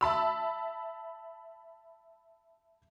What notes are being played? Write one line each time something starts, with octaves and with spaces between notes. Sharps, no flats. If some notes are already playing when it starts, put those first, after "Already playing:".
E5 A5 B5 E6